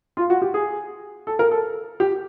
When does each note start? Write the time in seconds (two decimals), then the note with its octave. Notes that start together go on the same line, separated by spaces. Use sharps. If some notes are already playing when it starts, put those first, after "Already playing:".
0.17 F4
0.30 F#4
0.42 G4
0.54 G#4
1.27 A4
1.39 A#4
1.51 A4
2.00 G4